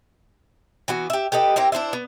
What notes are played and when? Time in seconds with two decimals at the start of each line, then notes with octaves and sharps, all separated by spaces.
0.88 E3 B3 F#4
1.10 G4 E5
1.32 G4 A4 B4 D#5
1.56 C4 E4 G4 A#4
1.72 D4 E4 C5 E5
1.93 B3